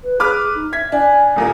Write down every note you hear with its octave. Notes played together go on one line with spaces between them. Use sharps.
B4
G#4 B4 D6 F6
D#4
E5 G#6 B6
D4 G#5
D#1 A#2 A#3 G#5